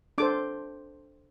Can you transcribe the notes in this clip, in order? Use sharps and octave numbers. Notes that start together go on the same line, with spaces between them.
D4 A4 C5 D6